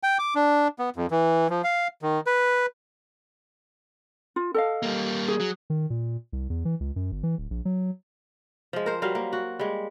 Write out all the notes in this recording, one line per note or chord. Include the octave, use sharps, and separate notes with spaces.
G5
D6
D4
B3
F2
E3
F3
F5
D#3
B4
F4
A4 D#5 F5
G3 A#3
G#4
F#3
D#3
A#2
C2
E2
E3
C#2
F#2
G1
E3
D1
A#1
F#3
F3 G#3
A#4 C5
F#3 G3 A#4 F5
A#3
F#4
G3 G#3